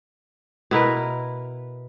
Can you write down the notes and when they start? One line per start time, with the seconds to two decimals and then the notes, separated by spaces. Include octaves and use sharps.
0.71 B2 E4 A#4 B4